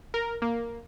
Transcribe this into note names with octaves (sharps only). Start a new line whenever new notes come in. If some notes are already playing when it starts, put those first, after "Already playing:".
A#4
A#3